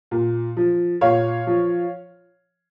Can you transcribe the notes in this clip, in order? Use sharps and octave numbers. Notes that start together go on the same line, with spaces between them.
A#2
F3
A#2 C#5 F5
F3